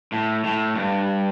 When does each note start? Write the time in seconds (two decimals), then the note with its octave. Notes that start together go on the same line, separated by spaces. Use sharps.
0.12 A2
0.44 A2
0.76 G2